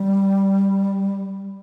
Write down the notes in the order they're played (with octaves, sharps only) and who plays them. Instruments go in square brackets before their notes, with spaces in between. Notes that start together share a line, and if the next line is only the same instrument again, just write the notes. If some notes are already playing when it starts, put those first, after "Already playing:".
Already playing: [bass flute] G3